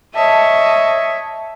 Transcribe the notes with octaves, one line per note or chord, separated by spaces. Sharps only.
C#5 D#5 E5 A5